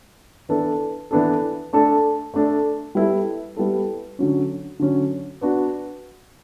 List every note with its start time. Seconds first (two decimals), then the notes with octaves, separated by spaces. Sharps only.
0.49 E3 B3 D4 A4
1.11 E3 B3 D4 A4
1.73 A3 D4 A4
2.34 A3 D4 A4
2.95 G3 B3 E4 A4
3.57 G3 B3 E4 A4
4.19 D3 F#3 C#4
4.80 D3 F#3 C#4
5.41 B3 D4 F#4